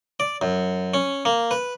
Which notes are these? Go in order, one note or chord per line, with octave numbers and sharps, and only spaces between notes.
D5
F#2
C#4
A#3
B4